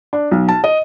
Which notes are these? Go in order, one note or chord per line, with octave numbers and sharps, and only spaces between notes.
D4
B1
A5
D#5